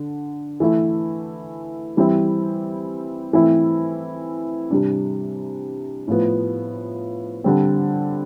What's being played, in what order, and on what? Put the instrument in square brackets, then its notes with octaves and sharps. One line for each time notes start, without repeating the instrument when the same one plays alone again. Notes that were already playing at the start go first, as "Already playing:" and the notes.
Already playing: [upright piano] D3
E3 A3 E4
E3 G3 C4 E4
E3 A3 C4 E4
C3 G3 D4
A2 F3 B3
D3 G3 C4